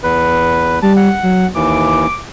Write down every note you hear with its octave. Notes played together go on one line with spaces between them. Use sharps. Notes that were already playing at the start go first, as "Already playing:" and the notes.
E2 B4
G3 A5
F#5
F#3
D#2 E3 D6